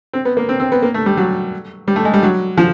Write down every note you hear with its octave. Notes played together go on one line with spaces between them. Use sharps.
C4
B3
A#3
C4
C4
B3
A#3
A3
G3
F#3
G3
A3
G#3
G3
F#3
F3